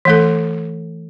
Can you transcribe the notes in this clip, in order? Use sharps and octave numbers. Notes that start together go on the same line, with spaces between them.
E3 A3 A4